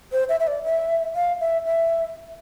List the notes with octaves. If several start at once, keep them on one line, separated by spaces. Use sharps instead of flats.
C5
E5
E5
D5
E5
F5
E5
E5